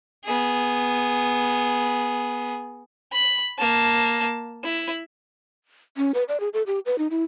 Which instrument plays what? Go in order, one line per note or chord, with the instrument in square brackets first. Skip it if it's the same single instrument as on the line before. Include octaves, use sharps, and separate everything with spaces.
[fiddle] B3 G#4
B5
A#3 A5
E4
[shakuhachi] C#4
B4
D5
G#4
A4
G4
B4
D#4
E4